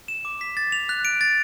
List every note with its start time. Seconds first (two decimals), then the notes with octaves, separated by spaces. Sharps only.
0.08 E7
0.25 D6
0.41 B6
0.57 A6
0.72 F7
0.89 F#6
1.05 D7
1.21 A6